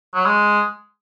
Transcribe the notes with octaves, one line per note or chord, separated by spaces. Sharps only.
F#3
G#3